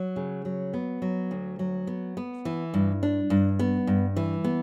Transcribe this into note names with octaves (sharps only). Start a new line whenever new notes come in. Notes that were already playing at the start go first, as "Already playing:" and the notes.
Already playing: F#3
C#3
F#3
B3
F#3
D2
F#3
B3
B3
E3
G2
D4
G2
B3
G2
E3
B3